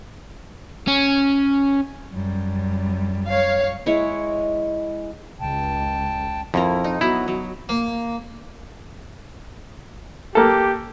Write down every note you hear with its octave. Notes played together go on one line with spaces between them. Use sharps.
C#4
F#2 G3
C#5 F5
G#3 E4 G#4 C#5
C#2 G5 A5
F2 E4 A4 A#4
D#4
F#3 B3 E4 A#5
F#3
A#3
A#3 G4 A4